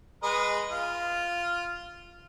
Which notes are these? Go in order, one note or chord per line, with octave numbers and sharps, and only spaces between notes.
G#3 B4 D#5
F4